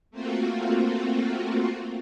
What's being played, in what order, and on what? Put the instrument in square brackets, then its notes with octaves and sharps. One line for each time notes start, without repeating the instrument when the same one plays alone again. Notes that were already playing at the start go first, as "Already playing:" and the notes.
[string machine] A3 A#3 C4 F4 F#4